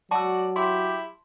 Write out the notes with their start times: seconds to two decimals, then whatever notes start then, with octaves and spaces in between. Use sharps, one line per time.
0.11 F#3 F#4 D5 A5 E6
0.56 E4 G4 C6